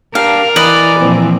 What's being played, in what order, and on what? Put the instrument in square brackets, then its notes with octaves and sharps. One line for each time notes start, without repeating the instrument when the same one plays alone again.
[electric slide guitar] D4 G4 [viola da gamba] A#4 [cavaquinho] F5
[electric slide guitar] E3 [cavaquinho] B4 D5 D#5
[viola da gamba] A#2 F3 C4